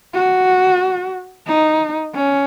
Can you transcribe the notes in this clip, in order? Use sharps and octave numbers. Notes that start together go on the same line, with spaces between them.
F#4
D#4
C#4